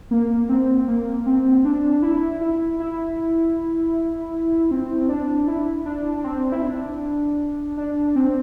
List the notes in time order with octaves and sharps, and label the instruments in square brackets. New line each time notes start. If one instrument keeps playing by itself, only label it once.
[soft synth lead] A#3
C4
A#3
C4
D4
E4
E4
E4
C4
D4
E4
D4
D4
C4
E4
D4
D4
C4